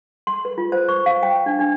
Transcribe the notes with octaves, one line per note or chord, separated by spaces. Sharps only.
C6
B4
F4
C5
C#6
F5
G5
D4
D4